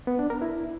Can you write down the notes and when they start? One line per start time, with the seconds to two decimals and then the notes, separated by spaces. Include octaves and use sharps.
0.07 B3
0.19 D4
0.30 A#4
0.42 E4